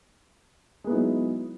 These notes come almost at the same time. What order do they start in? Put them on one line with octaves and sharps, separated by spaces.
G#3 B3 E4 D#4 F#3